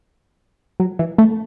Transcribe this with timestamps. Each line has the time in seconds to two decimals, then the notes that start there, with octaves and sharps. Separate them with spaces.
0.80 F#3
0.99 E3
1.18 A3